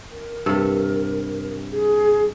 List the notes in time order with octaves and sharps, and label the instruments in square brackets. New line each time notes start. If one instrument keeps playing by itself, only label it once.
[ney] A#4
[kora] G2 C3 A4
[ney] G#4